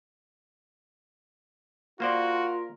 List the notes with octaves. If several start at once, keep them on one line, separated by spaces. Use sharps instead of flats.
A#3 F4 F#4 A#4 C5 D5